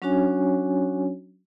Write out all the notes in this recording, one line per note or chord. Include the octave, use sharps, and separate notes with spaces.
F#3 C#4 D4 F#4 C#5 G#5